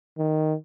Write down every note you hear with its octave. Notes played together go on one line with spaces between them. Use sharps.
D#3